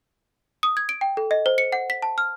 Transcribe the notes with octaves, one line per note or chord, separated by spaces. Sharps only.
D#6
G#6
D7
G5
A4
D#5
C5
C#7
F#5
B6
A5
F6